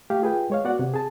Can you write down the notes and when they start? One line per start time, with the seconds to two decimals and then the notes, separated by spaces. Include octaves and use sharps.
0.10 A3 G4 F5
0.22 F4 G#4 B4 G5
0.50 G#3 C#5 F5
0.65 B3 F#4 D5 F#5
0.79 C3
0.94 G#4 A5